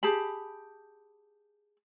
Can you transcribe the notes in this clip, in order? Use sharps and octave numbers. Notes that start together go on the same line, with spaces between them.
G4 G#4 A5 B5